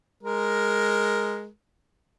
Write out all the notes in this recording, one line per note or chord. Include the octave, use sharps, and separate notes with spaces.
G#3 A#4